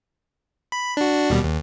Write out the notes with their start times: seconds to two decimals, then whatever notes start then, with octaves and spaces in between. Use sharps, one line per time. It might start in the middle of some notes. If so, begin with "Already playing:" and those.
0.72 B5
0.97 D4 F#4
1.30 D#2 B2 G3
1.44 D#2